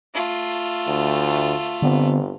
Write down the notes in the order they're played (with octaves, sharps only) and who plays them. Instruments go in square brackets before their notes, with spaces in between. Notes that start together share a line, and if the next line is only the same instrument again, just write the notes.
[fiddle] A3 F4
[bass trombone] D2
[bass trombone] G1 [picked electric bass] D3 B3 C4